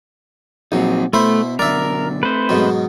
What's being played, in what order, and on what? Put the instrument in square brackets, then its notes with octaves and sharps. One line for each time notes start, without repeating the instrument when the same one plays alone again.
[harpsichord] A#1 F#3 [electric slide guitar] C4 D#4
[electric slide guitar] B2 [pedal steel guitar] A3 [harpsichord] E4 C5 B5
[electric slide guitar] F#2 B2 D3 [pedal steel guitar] A#4 [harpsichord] D5 E5
[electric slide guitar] A3 C4 [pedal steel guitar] B4 C5
[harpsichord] G#2 B2 F#3